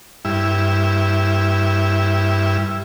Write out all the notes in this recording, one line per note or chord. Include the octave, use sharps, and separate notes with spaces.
G2 E4